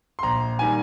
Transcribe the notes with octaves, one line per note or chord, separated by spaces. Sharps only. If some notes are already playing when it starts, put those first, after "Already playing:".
C6
A#1 A#5
D#3 G3 G#5